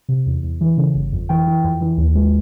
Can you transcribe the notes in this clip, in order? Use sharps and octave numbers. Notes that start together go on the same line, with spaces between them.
C3
E2
E2
E3
C#3
G1
F2
E3 G5
E3
F2
E3
D#2
G#3